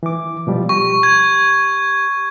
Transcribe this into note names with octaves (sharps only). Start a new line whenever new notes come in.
E3 D6
B2 F3 G3
G4 C#6
G#6